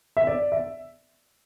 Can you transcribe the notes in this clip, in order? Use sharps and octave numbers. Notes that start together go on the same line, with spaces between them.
E5
D5
E5